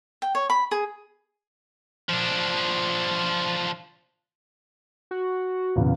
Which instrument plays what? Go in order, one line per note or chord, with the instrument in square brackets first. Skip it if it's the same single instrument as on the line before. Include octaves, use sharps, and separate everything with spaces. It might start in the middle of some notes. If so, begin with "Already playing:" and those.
[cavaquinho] G5
C#5
B5
G#4
[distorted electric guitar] F3 D4
[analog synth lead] F#4
[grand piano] E2 A#2 C#3